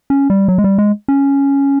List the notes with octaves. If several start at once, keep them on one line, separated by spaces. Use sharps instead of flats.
C#4
G3
F#3
G#3
G3
G#3
C#4